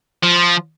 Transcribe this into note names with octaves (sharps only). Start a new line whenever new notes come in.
F3